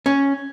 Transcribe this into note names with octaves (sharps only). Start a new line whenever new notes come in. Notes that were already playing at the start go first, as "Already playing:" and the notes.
C#4